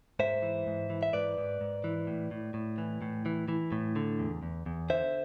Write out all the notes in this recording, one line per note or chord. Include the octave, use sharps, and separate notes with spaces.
G#2 C5 E5
E3
G#2
E3
E5
G#2 B4 D5
G#2
G#2
E3
A2
A2
A2
E3
A2
E3
E3
A2
D3
E2
E2
E2
D3 C5 E5